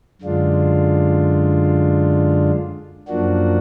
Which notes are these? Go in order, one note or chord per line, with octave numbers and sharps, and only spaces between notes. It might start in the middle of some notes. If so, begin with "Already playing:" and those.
F#2 D3 G#3 D4 F4
F#2 F3 A#3 D4 F#4